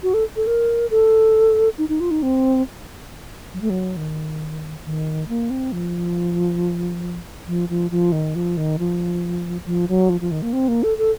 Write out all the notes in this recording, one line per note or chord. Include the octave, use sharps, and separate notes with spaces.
F#4
A4
A4
A#4
A4
D#4
D#4
F4
D#4
C4
F#3
A3
F#3
D#3
D#3
A#3
C4
F3
F3
F3
F3
D#3
F3
D#3
F3
F3
F#3
F3
F3
D#3
A#3
C4
A#3
A4
A4